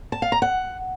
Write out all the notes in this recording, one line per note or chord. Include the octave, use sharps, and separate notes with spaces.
A5
F5
A#5
F#5